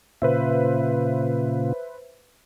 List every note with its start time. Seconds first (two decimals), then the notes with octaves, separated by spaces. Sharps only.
0.22 A#2 C#3 F4 B4 C5 E5